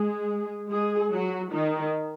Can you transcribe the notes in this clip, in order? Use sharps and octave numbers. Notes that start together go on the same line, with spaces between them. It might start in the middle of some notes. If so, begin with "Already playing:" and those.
Already playing: G#3 G#4
G#3 G#4
F#3 F#4
D#3 D#4